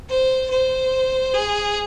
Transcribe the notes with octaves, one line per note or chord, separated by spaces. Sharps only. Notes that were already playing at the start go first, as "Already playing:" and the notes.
C5
C5
G#4